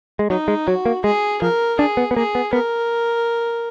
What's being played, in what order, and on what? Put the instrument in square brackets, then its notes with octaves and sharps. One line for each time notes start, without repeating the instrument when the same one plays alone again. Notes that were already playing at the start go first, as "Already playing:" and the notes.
[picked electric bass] G#3
[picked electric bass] F#3 [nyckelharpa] D#4
[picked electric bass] G#3
[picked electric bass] F#3 [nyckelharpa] F#4
[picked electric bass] A#3
[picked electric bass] G#3 [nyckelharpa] G#4
[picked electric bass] F3 [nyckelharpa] A#4
[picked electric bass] D4 [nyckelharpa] G#4
[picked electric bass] B3
B3
[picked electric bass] A#3 [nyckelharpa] G#4
[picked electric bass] B3
[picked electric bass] B3 [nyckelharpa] A#4